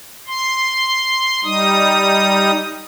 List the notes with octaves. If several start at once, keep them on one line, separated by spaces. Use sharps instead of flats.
C6
G3 D#4 D#6